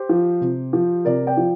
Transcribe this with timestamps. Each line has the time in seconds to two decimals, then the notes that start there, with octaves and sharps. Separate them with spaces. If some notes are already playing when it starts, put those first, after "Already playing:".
Already playing: G4 C5
0.09 F3
0.41 C3
0.73 F3
1.05 C3 A#4 D5
1.27 D5 G5
1.37 F3